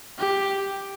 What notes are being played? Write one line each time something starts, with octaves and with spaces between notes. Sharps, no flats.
G4